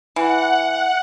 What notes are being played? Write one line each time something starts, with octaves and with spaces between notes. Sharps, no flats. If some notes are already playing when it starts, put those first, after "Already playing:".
E3 F#5